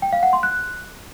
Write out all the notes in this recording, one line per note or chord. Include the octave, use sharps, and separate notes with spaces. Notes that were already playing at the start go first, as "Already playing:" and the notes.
G5
F5
F#5
C6
F#6